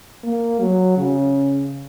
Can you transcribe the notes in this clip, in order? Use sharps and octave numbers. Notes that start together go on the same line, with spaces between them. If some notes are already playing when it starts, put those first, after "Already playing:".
A#3
F#3
C#3